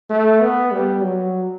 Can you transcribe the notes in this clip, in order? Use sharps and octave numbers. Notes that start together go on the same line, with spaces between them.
A3
B3
G3
F#3